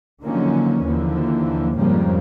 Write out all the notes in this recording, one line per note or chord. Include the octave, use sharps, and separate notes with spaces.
D3 D#3 F3 F#3 A#3 C#4
D#2 D3 E3 F3 A#3
F2 G#2 C#3 F3 G3 A#3